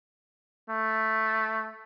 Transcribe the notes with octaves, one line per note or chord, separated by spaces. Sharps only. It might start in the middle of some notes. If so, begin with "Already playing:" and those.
A3